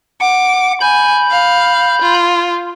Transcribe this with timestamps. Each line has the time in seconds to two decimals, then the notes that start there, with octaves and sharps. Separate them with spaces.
0.21 F#5 D6
0.81 G#5 B5 G6
1.31 F5
2.02 F4